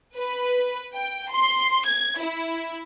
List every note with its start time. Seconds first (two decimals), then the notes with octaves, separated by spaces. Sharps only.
0.17 B4
0.95 G5
1.32 C6
1.85 G#6
2.20 E4